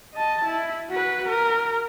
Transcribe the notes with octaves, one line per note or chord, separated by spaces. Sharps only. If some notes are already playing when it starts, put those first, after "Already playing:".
D#5 A5
E4
F#4 B4
A#4